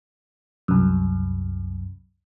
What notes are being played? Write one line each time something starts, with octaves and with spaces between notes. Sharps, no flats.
C2 F#2